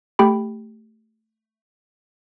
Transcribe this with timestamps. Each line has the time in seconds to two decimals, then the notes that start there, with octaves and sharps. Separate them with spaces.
0.19 A3 G4 G5 B5